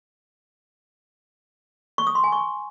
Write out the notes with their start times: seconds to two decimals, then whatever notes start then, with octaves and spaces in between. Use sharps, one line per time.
1.98 C#6
2.07 D#6
2.15 C6
2.24 G#5
2.32 C#6